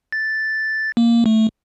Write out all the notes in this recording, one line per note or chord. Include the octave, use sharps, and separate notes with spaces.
A6
A#3
A3